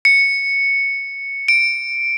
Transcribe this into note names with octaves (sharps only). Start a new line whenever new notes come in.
C#7
D7